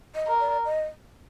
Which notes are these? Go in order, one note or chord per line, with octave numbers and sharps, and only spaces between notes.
D#5
A#4
D5
D#5